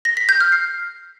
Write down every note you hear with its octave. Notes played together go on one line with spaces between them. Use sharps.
A#6
B6
G6
F6
C7